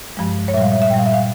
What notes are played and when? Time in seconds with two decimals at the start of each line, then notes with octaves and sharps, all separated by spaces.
0.17 G2 F3 G#3
0.48 C#5
0.53 A#2 E5
0.57 G3 F5
0.72 E5
0.82 E5
0.90 A#2 G5
0.94 G3 F5
1.06 E5
1.14 F5